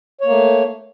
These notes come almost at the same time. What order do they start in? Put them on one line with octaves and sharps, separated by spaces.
C#5 A#3 A3